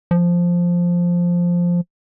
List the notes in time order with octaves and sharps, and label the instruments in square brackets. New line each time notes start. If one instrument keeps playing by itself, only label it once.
[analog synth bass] F3